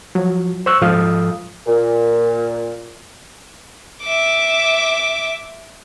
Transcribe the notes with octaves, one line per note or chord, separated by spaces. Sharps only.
F3 F#3
C5 C#6 E6 F#6
G#2 F3 A4 F5 D#6
A#2
E5 D6